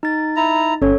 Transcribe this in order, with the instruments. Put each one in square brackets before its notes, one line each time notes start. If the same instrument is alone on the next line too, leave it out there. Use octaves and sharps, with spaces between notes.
[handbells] D#4 A6
[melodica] E4 A#5
[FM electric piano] G1 C#4 [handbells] A4 C#5